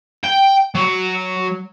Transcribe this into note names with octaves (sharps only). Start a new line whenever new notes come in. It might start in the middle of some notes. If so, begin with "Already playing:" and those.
G5
F#3